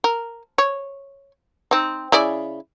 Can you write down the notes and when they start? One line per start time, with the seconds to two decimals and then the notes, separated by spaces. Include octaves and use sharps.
0.04 A#4
0.58 C#5
1.71 C4 D#4
2.12 C#3 E4 D5